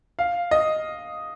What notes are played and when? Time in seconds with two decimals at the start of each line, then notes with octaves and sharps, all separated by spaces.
0.19 F5
0.51 D#5